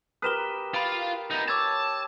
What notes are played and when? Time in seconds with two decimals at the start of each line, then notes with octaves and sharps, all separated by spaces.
0.22 G4 A#4 B4 D#6 E7 G7
0.74 F4 B5 D7
1.31 B3 D#4
1.48 C#5 A5 D6 E6 G#6